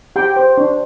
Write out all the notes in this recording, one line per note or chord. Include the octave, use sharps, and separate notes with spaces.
G4 G5
C5
D4